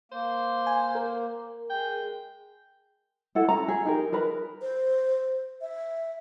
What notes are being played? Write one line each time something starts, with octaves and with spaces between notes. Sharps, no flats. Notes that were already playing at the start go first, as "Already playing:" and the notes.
A#3 C5
G#5
A#4
G#3 G5
E4 A4 F#5
C#4 A#5
G#4
D#4 G4 A#4
G#4 A#4 B4 B5
C5
E5